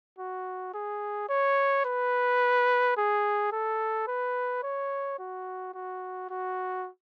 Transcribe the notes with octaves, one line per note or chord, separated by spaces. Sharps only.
F#4
G#4
C#5
B4
G#4
A4
B4
C#5
F#4
F#4
F#4